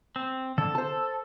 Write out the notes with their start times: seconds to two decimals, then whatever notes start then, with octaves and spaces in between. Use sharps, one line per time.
0.16 C4
0.58 D3 A4
0.75 C5 A5